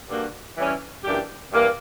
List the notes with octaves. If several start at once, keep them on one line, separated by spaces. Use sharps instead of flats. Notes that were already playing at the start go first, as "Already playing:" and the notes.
G2 D3 A#3 D4 F#4
E3 G3 C#4
F#2 E3 A#3 D4 G4
G2 E3 A#3